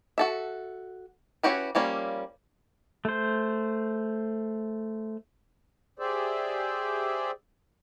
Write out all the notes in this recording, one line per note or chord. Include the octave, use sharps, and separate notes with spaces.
F#4 A4 E5
C#4 E4 F#4 G4 B4
F3 G3 A#3 C#4
A3 C5
G4 G#4 C5 D5 E5